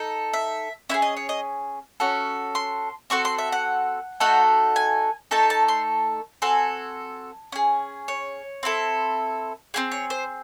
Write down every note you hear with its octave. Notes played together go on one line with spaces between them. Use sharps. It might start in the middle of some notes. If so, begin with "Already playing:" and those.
Already playing: D#4 A4
E5
C#4 E4 G#4 E5
D#5
C#5
D#5
C#4 F#4 A4
C6
C4 F#4 A4 C#6
C6
E5
F#5
A3 D#4 F#4 A4
G#5
A3 D#4 A4 A5
A5
C6
C4 F#4 A4 G#5
C#4 G#4
C#5
C4 E4 A4
C4 E4 G#4
C#5
C5